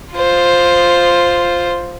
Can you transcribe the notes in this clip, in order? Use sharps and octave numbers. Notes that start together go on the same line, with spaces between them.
F4 C5